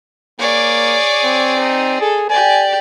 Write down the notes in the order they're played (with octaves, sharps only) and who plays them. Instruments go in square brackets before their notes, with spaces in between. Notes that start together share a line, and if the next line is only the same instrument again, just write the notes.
[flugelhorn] A#3 [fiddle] G#4 D5 [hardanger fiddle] C#5 D6
[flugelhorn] C4
[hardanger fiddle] D#4
[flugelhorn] G#4 [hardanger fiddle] A4
[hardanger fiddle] G4 D5 [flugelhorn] G#5